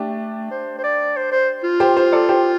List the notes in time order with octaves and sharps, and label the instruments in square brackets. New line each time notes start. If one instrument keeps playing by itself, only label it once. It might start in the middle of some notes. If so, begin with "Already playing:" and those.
Already playing: [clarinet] A3 [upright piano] D4 G4
[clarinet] C5
C5
D5
C5
C5
F4
[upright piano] G4 C5
G4 C5
A4 D5
G4 C5